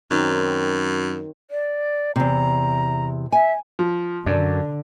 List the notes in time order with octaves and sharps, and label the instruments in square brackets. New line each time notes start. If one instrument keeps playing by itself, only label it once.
[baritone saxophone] F#2 [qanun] D#3 F#3 C4
[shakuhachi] D5
[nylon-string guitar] E2 C3 [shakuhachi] A#5
[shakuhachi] E5 [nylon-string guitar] G#5
[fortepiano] F3
[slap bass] F#2 [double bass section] D3 [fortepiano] D4